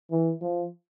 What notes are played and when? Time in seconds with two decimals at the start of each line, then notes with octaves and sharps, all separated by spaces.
0.11 E3
0.42 F3